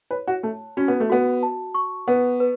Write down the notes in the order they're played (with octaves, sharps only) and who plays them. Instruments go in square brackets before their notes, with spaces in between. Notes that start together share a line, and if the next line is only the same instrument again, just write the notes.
[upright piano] B4 [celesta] C#5
[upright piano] F#4
[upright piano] A3 [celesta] A5
[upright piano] C#4 [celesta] F#4
[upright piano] B3
A3
[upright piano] B3 [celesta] F#4
[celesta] A5
C#6
[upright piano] B3 [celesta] B4
[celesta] B4